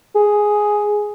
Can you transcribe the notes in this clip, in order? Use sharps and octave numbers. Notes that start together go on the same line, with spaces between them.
G#4